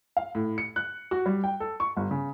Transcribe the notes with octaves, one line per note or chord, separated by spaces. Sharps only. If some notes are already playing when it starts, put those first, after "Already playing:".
F5
A2
C#7
F#6
F#4
G3
G5
A4
C#6
G1
C#3